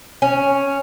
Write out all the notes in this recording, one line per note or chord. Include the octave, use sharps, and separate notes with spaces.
C#4